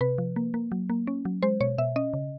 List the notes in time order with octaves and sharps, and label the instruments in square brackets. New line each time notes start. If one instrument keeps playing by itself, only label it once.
[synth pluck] C3 B4
F3
A#3
A#3
F#3
A#3
C#4
F#3
G#3 C5
B2 C#5
B2 E5
C#4 D#5
C#3